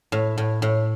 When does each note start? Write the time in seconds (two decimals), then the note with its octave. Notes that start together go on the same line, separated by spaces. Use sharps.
0.12 A2
0.38 A2
0.62 A2